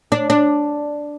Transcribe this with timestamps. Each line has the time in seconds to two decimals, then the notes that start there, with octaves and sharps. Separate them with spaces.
0.12 D4
0.30 D4